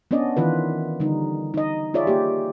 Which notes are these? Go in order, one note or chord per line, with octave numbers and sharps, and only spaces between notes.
B3 C#4 D4 D5 D#5
D#3 E3 F4 B4
D3 G3 D#4
D#4 D#5
F4 G#4 C#5 D5 E5
A#3 G4